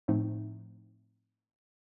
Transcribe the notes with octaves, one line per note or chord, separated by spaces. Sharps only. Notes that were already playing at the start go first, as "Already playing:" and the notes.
A2 F3 A3 C4 D#4